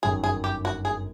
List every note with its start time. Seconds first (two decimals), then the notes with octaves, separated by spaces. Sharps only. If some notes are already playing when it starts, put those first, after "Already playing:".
0.03 G1 F#2 D#3 F#3 G#4
0.24 G#4
0.44 G4
0.65 F#4
0.85 G#4